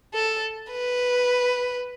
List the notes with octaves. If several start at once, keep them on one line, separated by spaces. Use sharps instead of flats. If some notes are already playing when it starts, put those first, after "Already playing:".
A4
B4